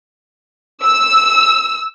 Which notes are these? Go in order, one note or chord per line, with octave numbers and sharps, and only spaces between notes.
E6